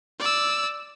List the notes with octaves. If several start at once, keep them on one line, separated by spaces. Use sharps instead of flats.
D5 E6